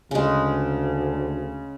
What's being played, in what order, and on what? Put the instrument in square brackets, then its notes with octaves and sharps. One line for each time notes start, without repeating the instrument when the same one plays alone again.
[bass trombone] D2 [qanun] C#3 G#3